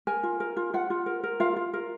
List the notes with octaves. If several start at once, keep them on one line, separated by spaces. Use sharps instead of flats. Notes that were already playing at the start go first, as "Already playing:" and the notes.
A#4 G#5
F4
A#4
F4
F4 F#5
F4
A#4
A#4
F4 F5
F4
A#4